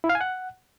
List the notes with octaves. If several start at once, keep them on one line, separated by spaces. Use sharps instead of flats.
E4
F5
G#5
F#5